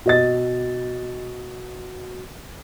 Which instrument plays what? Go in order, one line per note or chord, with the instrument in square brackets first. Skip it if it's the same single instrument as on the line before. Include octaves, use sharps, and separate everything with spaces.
[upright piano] B2 D#5 A6